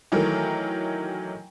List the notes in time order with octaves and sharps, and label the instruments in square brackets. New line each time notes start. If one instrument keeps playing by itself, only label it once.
[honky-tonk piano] D#3 E3 F#3 A3 A#4